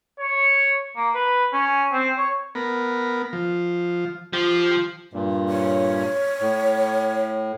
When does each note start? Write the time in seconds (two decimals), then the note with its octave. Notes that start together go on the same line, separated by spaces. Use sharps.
0.20 C#5
0.96 A#3
1.14 B4
1.53 C#4
1.93 C4
2.18 C#5
2.55 B3 A#4
3.33 F3
4.33 F3 G4 C6
5.13 G2 A#2
5.49 C#5
6.41 A2